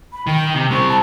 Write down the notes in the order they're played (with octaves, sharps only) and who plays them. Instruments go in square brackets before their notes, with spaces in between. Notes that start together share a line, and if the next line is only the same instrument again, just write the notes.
[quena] B5
[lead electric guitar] D#3 [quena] G5
[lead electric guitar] C3
[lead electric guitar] G3 C4 [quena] C#6
[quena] A5